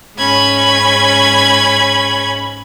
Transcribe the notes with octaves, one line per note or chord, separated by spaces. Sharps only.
G#2 C#4 B5 G#6